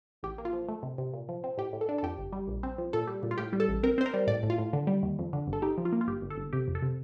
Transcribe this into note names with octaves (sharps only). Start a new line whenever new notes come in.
A1 G4
A#3
F4
F3
A3
C3
C3
A#2
F3
C4
A2 G4
A2
A4
D4
A4
F2 G4
G1
G3
A#1
C4
F3
A#2 A4
G3
A#2
F4
A2 G4
G3
A4
A1
C4 A#4
C4 C5
A#4
G3
A2 D5
A2
F4
A2
D3
G3
D#2
F2
D3
G1
A4
D#4 G4
F3
F4
A#3
F4
G1 G4
G1
A4
G1
C3 G4
F2
A4
C3